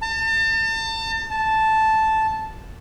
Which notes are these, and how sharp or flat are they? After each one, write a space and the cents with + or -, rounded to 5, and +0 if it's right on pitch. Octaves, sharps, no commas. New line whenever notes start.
A5 +35
A5 -5